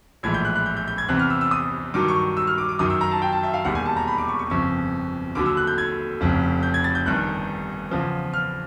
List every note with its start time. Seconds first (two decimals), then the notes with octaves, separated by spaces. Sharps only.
0.23 A#1 A2 E3 G#3 G#6
0.34 G6
0.45 F#6
0.55 F#6
0.66 G6
0.77 G6
0.88 G6
0.98 G#6
1.08 E2 C3 E3 F#6
1.19 F6
1.30 E6
1.41 E6
1.51 D#6
1.94 G2 D#3 F#3 D6
2.08 C#6
2.37 E6
2.47 F6
2.58 D6
2.69 D6
2.79 F#2 D#3 F#3 D#6
2.90 E6
3.01 A#5
3.11 A5
3.22 G5
3.32 A5
3.43 E5
3.54 F5
3.65 E1 D#2 D#3 G3 F#5
3.75 G#5
3.86 A5
3.96 A#5
4.07 B5
4.18 D6
4.29 C#6
4.39 C#6
4.50 G1 F2 C#3 C#6
5.35 D#2 D3 F#3 D6
5.46 E6
5.57 F#6
5.67 G6
5.78 G#6
6.21 F1 F2 C#3
6.63 G6
6.74 G#6
6.84 A6
6.95 G6
7.06 G1 G2 D#3 F#6
7.91 E2 C#3 F3
8.34 F6